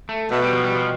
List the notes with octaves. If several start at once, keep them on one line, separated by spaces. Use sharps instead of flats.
A3
B2 A3
G3
F3
G3
F3